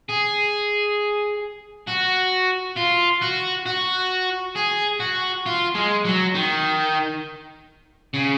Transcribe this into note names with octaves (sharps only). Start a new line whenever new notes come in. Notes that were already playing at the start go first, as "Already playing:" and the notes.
G#4
F#4
F4
F#4
F#4
G#4
F#4
F4
G#3
F#3
D#3
C#3